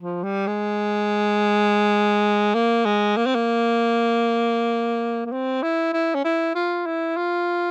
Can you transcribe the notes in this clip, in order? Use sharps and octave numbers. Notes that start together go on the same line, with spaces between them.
F3
G3
G#3
A#3
G#3
A#3
C4
A#3
A#3
C4
E4
E4
C#4
E4
F4
E4
F4